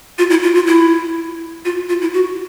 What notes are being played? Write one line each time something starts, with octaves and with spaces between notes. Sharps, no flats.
F4
E4
F4
F4
E4
F4
F4
E4
F#4